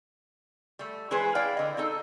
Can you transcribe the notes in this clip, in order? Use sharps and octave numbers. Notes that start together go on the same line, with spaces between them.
G3 A3
E3 G#3 G#4 B4 C5
E4 D5 F5 G5
D3 D#5
C4 D#4 A4